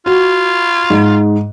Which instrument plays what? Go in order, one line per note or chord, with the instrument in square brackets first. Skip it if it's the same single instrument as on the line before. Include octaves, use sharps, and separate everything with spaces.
[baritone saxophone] F4 [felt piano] F#4
[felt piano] G#2